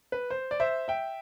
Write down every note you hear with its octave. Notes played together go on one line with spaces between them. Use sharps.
B4
C5
D5
C5 E5
E5 G5